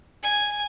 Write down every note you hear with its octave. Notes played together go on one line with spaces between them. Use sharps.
G#5